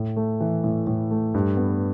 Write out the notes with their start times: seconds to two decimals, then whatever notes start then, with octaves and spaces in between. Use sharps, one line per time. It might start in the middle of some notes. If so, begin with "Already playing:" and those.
Already playing: A2
0.17 A3
0.40 E3
0.64 A2
0.87 A2
1.11 A3
1.34 G2
1.57 B3